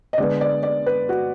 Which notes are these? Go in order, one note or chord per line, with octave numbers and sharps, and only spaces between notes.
D#5
D3 G#3 B3 D5
D5
D5
B4
F#4